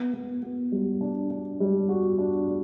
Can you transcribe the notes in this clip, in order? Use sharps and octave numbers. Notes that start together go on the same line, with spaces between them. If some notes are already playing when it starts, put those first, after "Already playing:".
Already playing: B3
B3
B3
G3
D4
D4
G3
F#4
D4
D4